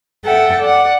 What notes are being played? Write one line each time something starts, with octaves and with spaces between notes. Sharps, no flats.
A4 E5 F#5 G5
D5 F#5